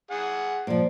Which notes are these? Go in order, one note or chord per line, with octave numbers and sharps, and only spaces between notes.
G#4 F#5
A#2 F3 C5 D5